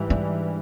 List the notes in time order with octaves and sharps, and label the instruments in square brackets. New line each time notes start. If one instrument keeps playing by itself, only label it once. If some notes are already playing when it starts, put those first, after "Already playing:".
Already playing: [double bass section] G#2 E3 G3
[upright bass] D4